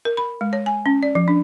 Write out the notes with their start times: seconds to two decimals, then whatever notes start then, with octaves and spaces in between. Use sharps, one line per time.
0.05 A#4
0.17 B5
0.41 G#3
0.53 C#5
0.66 G#5
0.86 C#4
1.03 D5
1.15 F3
1.28 D4